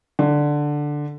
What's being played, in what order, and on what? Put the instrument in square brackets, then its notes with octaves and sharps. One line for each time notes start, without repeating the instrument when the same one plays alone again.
[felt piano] D3